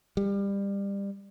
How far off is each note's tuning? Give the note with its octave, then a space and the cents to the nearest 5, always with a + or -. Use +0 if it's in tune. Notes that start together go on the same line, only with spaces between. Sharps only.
G3 +25